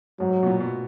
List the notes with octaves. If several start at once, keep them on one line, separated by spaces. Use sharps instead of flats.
G#2 F#3
B2
A#2
B2